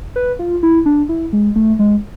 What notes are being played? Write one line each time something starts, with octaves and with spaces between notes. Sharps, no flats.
B4
F4
E4
D4
E4
G#3
A3
G#3